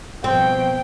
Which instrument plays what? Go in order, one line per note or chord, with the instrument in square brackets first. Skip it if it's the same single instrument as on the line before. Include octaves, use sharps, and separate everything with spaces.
[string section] B2 F3 [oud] C4 [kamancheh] G5